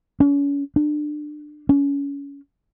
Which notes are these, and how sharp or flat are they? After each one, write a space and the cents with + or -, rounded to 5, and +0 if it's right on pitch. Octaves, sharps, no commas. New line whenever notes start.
C#4 +35
D4 +25
C#4 +25